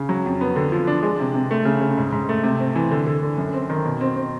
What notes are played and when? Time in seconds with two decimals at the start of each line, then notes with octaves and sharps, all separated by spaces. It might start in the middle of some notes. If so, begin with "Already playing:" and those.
Already playing: C#3
0.09 F#3
0.26 F2
0.41 B3
0.56 D3
0.72 F3
0.87 D4
1.03 G#3
1.19 C3
1.34 C3
1.51 A3
1.65 C#3
1.81 C#3
1.97 G#2
2.12 G#2
2.29 A3
2.43 C3
2.60 C4
2.75 E3
2.92 D3
3.06 D3
3.23 D3
3.38 F#2
3.54 C4
3.70 D#3
3.85 B2
4.01 C4
4.16 C4